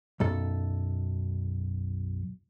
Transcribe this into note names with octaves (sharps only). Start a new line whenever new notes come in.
B1 F#2 A4